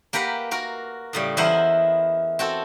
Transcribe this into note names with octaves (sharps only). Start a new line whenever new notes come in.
A#3 G4 A#4 B4 F#5
F#4 A#4
A2 C#3 G3
E2 E4 A#4 C5 D#5 F#5
C4 F#4 A4